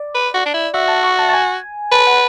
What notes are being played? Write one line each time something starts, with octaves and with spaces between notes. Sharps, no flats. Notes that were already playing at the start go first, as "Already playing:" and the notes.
Already playing: D5
B4
F#4
D4
E4
F#4 E5
A5
C#6
A5
A5
G#5
B4 A5
F#5